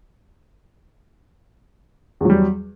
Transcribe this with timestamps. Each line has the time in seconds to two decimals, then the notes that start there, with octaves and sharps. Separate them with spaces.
2.21 E2
2.25 F#3
2.30 G3